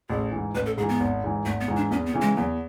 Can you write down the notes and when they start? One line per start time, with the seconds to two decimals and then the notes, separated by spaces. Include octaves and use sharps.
0.10 A1 G#4
0.32 G#2 E3
0.54 A1 B4
0.66 A4
0.77 G#2 G#4
0.83 E3
0.89 B3
1.00 G#1
1.24 G#2 E3
1.45 G#1 A3
1.61 B3
1.68 G#2 E3
1.77 D4
1.91 E2 C#4
2.06 B3
2.14 C#3 E3
2.21 G#3
2.37 E2 F#3